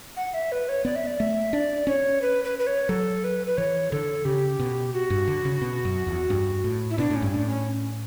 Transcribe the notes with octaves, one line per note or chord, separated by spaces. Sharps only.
F#5
E5
B4
C#5
B3 D5
E5
D5
A3 E5
D4 D5
C#4 C#5
B4
B4
B4
C#5
F#3 A4
B4
B4
E3 C#5
D3 A4
C#3 G4
B2
F#4
G2
D3
C#3
B2
F#2
E2
G2
A2
E4
B2 D4
A2
C#4
G2
A2 D4
C#4